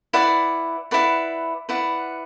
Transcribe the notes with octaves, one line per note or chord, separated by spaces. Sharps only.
E4 B4 D5 F#5
E4 B4 D5 F#5
E4 B4 D5 F#5